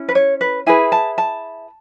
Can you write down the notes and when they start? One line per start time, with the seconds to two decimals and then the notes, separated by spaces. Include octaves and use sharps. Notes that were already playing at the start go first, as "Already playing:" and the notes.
Already playing: C#4 E4
0.09 B4
0.15 C#5
0.41 B4
0.66 E4 G#4 B4 G#5
0.92 A5
1.18 A5